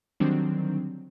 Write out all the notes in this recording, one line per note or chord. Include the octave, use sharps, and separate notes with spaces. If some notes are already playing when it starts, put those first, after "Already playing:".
D3 D#3 F#3 G3 C4 D4